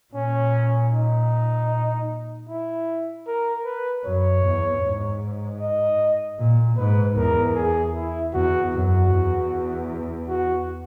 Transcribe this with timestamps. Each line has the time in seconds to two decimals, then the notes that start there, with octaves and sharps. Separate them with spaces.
0.14 A#2 C#4
0.92 D#4
2.49 E4
3.27 A#4
3.65 B4
4.04 F#2 C#5
4.43 E2
4.82 G#2
5.61 D#5
6.39 A#2
6.77 G#2 B4
7.16 E2 A#4
7.55 G#4
7.94 E4
8.33 E2 F#4
8.73 F#2 F#4
9.12 E2
10.28 F#4